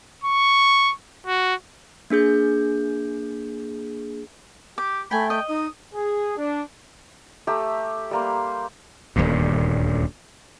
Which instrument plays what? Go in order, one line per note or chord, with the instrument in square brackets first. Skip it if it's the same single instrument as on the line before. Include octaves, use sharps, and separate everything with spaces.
[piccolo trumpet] C#6
F#4
[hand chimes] A#3 D4 G#4 G6
[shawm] G4 [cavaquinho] D6
[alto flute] A3 [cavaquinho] G5 G#5 [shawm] B5
[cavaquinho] D#5 [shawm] G5
[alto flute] D#4 [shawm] D#6
[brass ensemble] G#4
D4
[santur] A3 G4 A#5 E6
G3 A#3 C6
[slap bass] D#1 D2 G2